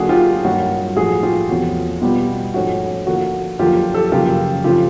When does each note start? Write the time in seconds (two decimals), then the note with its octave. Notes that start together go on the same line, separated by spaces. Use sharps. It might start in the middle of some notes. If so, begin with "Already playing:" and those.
Already playing: D3 F#3 A#3 D4 F#4 G#4
0.09 F4 G4
0.44 G2 D#3 F#3 A#3 C#4 F#4
0.96 A2 F3 A3 F#4 G#4
1.23 F4 G4
1.49 E2 C3 F3 A3 C#4 F#4
2.01 B2 G3 B3 F4 G4
2.54 G#2 F3 A3 C#4 F#4
3.07 D3 F3 A#3 F#4
3.59 F#2 D3 F3 A#3 F4 G4
3.94 G4 A4
4.12 F#2 C#3 F3 A#3 F4 G4
4.64 C#3 F3 A3 C4 F4 G4